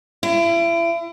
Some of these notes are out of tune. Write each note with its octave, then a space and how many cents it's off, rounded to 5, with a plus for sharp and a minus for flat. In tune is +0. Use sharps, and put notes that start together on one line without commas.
E4 +35